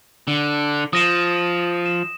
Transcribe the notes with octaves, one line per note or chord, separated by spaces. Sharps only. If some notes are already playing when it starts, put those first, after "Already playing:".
D3
F3 D#6 A#6 E7
E7